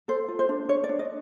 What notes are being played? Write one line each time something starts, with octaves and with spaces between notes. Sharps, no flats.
A4 C5
F4
C5
D4
D4 C#5
D5
D4
D#5